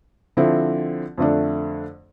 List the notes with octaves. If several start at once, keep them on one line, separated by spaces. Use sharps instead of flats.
D3 F3 C4 E4
F2 D3 A3 D4